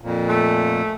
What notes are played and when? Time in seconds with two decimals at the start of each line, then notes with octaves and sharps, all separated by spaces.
0.01 F2 A#2
0.29 A3